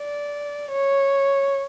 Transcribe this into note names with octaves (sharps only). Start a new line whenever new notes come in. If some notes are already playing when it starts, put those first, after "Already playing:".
Already playing: D5
C#5